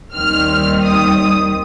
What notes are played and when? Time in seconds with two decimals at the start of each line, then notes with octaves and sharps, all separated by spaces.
0.14 D#2 D#3 G3 C4 F6
0.84 D#6